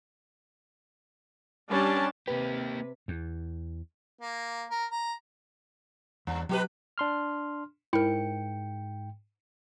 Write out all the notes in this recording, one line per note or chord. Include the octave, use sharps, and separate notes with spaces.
G3 C#4 D4 A5
C3 A#3 G4 B4
E2
A#3
A#4
A#5
E2 G2
B2 F#3 G4 B4
D4 C6 F6
G#2 E4 A#4 G5 C#7